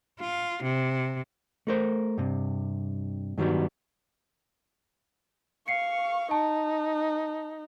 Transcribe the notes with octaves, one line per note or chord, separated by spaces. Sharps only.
F4
C3
A3 A#4 C5
G2 C3
G2 D#3 F#3 G3 B3
F5 C#6 C7 C#7
D#4 A5